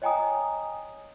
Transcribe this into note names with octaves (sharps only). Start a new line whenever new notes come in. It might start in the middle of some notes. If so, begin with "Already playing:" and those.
C#5 D#5 G5 G#5 A#5 D#6